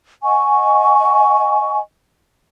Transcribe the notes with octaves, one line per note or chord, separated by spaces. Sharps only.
D#5 F#5 G#5 C#6